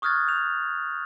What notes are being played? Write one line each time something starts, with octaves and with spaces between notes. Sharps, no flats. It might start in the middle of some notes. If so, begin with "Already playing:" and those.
C#6 D#6 F6 F#6 G#6 A6
G6 F7